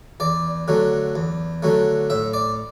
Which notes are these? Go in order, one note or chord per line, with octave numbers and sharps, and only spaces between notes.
E2 D5
D3 F#3 A3
E2
D3 F#3 A3
A2 E5
D5